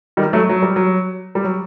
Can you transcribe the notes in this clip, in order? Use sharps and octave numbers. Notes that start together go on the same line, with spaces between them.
D#3 G3
F#3 A3
F#3
G3
F#3
G3
F#3